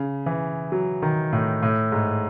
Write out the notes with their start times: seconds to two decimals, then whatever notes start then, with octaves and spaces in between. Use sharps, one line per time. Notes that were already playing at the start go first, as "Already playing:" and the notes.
Already playing: C#3
0.26 E3
0.72 F#3
1.02 D#3
1.32 A2
1.62 A2
1.92 G#2